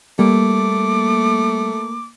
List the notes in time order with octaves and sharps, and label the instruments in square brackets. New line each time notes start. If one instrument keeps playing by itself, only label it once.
[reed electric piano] G3 [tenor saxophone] A3 [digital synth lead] A#3 [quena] D6